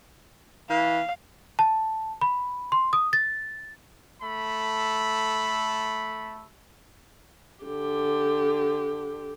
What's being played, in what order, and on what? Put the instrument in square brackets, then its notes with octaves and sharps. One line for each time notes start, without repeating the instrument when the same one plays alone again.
[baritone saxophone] E3 [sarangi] F5
[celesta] A5
B5
C6
D#6
A6
[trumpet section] A3 A4 B5
[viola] D3 G4